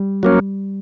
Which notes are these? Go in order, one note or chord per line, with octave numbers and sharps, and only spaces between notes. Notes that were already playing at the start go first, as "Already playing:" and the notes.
Already playing: G3
F#3 A#3 C#4